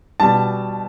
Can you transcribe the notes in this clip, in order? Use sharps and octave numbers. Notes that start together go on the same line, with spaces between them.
B2 G3 A5